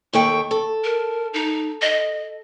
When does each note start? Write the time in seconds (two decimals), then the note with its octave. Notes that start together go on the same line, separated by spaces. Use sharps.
0.13 D#2 A4 G5 C#6
0.51 A4
0.84 A#4
1.34 D#4
1.82 D#5